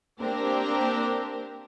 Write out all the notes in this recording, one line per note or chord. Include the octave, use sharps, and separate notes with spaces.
A#3 C4 D4 G4 A#4